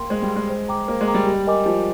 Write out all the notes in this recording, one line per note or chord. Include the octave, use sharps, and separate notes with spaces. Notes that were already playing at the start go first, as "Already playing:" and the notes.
Already playing: A#3 G5 C6
G#3 C5
G3
G5 C6
G#3
C5
G5 A#5 D6
A#3 C5
G#3
G5 A#5 D6
G3
G4
A#4 D#5 G#5 D6
F3 G4